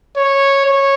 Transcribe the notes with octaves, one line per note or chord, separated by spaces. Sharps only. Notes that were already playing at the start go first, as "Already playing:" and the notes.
C#5
C#5